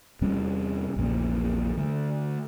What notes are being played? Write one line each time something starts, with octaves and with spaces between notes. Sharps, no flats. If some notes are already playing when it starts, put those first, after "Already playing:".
E2 C3 G3 C#4
A#1 E2 A#2 C#3
D3 A3